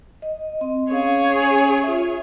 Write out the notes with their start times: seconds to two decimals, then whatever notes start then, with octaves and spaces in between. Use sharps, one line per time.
0.22 D#5
0.61 C4
0.91 C#4 G#4 C#5 F5
1.36 C#4 G#5
1.83 F4 E5